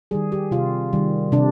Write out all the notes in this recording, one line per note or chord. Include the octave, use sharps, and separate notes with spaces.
D#3 G3 G#4
G4
C3 F4
D#3 G3
C3 D4